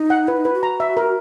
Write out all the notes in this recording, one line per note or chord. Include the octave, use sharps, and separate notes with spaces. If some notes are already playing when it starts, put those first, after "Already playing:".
Already playing: D#4
F#5
E4 B4
D#4
E4 B4
F#4
A#5
E5
A#4